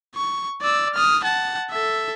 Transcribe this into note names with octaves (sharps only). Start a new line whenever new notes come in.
C#6
D5 E6
D#6 F6
F#5 A5
A4 E5